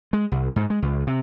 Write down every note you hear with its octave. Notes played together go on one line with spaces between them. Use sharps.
G#3
C2
G#2
G#3
C#2
C3